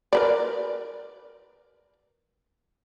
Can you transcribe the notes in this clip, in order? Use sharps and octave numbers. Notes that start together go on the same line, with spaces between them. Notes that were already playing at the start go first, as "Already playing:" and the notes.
A#4 B4 D5